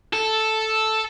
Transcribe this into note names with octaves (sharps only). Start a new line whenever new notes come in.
A4